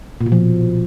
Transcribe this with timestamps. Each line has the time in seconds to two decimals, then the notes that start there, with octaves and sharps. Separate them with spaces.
0.21 A#2
0.26 B2
0.32 F3